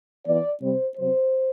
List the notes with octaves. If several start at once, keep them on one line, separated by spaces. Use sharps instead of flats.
E3 B3 D5
C3 G3 C4 C5
C3 F#3 C4 C5